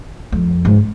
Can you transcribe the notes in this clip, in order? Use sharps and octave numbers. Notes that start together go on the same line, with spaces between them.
F2
G#2